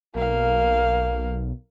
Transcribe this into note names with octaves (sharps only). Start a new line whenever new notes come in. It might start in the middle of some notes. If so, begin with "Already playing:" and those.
B1 A#3 F5